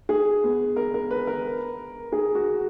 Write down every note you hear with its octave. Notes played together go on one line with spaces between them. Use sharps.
G#4
B3
A#4
A#4
B4
A#4
G#4
F#4